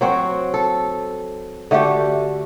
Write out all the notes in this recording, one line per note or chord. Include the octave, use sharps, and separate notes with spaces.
F#3 C4 F#4
A4
D3 A3 F#4 G4